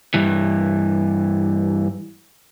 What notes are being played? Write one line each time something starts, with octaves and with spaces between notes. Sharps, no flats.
G2 E3